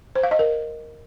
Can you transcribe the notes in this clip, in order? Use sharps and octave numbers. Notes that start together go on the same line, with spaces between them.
C5
F5
D#5
A#4